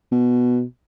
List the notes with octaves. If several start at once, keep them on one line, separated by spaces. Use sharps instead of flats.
B2